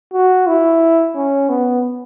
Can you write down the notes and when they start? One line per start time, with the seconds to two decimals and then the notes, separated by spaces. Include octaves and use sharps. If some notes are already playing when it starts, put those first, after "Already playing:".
0.13 F#4
0.47 E4
1.16 C#4
1.49 B3